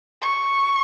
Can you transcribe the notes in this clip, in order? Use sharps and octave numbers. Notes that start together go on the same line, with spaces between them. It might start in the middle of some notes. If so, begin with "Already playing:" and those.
C#6